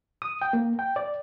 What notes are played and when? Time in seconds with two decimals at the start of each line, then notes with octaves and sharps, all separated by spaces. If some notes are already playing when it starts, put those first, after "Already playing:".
0.22 D#6
0.42 G5
0.53 A#3
0.79 G5
0.96 D5